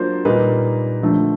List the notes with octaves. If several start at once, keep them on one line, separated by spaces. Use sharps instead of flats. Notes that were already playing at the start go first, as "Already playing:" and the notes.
Already playing: F#3 A#3 D4 F4 C5
A#2 G3 A#3 D#4 B4
D3 F3 A3